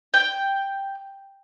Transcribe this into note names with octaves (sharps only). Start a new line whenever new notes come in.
G5